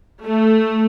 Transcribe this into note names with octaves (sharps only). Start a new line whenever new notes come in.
A3